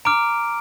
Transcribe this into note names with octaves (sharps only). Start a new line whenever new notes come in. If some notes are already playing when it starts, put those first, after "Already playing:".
A#5 D6 F6 D7